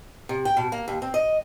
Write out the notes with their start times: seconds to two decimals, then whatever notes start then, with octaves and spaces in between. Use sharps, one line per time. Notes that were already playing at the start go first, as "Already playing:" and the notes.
0.29 C3
0.45 G5
0.57 B2
0.72 A#3
0.88 D#2
1.02 C4
1.14 D#5